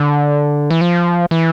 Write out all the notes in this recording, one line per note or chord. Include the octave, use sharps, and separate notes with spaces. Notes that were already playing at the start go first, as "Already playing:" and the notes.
Already playing: D3
E3
F3
E3